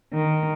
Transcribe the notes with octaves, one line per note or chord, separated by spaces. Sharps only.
D#3